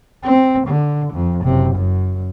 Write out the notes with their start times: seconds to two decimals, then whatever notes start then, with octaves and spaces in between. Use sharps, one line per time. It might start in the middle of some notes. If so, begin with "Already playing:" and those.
0.24 C4
0.67 D3
1.13 F2
1.44 F#1 C3
1.75 F#2